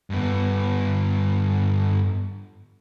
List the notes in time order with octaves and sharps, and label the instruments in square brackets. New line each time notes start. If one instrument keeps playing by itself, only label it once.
[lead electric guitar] G2 B3